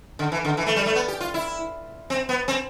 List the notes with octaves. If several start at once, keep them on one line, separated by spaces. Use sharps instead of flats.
D3
E3
D3
E3
A3
G3
A3
B3
G4
F4
E4
C4
B3
C4